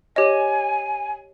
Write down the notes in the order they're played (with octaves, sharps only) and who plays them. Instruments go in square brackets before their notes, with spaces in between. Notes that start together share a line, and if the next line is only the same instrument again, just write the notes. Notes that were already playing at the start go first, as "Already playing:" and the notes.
[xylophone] G4 C#5 D#5 [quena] G#5